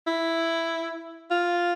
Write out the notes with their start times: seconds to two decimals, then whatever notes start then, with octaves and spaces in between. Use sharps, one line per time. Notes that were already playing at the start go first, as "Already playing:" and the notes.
0.07 E4
1.30 F4